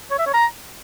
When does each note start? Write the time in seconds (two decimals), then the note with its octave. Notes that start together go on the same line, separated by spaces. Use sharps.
0.11 C#5
0.19 E5
0.26 C#5
0.34 A#5